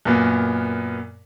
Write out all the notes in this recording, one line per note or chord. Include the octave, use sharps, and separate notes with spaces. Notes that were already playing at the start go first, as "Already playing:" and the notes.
F#2 A#2 B3